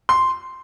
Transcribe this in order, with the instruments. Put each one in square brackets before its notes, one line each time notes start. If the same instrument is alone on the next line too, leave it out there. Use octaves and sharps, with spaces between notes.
[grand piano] C6